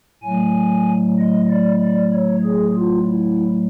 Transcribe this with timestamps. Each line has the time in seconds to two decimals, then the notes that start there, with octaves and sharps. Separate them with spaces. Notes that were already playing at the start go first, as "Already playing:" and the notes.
0.23 A2 F#3 A3 G#5
1.18 D#5
1.49 D5
1.81 D5
2.13 C#5
2.44 G#4
2.76 F4
3.07 E4